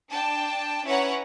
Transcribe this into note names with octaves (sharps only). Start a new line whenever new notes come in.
D4 G5 A5
C#4 E4 B4 C#5 F#5 A#5